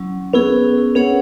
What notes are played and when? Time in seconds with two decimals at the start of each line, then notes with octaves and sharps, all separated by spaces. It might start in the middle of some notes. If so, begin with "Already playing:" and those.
Already playing: F#3 C#4 E4
0.33 B3 C#4 E4 G#4
0.95 B3 C#4 G#4 C#5 F#5